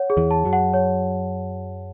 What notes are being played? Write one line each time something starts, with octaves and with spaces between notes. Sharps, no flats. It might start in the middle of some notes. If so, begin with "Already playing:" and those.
Already playing: C#5 F#5
G#4
E2 E3
A5
F#2 F#3
F#5
C#5